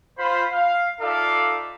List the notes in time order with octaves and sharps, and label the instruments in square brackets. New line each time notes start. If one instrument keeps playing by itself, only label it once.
[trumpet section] F4 C5 B5
F5
D#4 F4 A4 D5 E5 F5